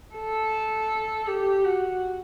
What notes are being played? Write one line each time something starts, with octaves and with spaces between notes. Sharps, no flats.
A4
G4
F#4